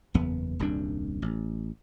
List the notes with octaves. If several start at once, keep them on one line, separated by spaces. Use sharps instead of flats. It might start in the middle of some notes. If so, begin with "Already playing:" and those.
F#1 E2 B3
D#1 C2 F#2 D4
A1